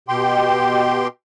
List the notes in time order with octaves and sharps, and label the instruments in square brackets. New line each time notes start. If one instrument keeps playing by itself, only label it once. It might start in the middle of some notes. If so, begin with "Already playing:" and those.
[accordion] B2 G4 G5 C6